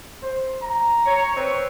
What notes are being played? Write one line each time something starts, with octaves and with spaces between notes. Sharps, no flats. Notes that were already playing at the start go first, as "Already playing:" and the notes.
C5
A#5
C#5
C4 B4 C#5